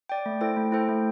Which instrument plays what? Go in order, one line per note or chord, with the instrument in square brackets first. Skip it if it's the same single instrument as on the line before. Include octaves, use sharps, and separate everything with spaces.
[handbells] D5 G5
A3
E4 A4 C5 G5
A3
E4 A4 C5 G5
A3